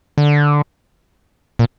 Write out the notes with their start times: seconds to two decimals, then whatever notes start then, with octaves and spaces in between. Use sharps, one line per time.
0.18 D3
1.59 A#2